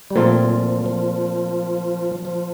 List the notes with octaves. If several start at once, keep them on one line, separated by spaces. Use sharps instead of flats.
G3
A#2 F3 A3 C4 F4
F3
F3
F3